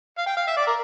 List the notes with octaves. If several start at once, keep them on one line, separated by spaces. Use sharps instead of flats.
F5
G5
F5
E5
D5
A#4